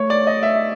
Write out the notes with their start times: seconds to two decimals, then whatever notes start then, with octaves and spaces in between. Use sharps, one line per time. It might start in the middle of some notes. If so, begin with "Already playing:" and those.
Already playing: A3 C#5
0.10 D5
0.27 D#5
0.43 E5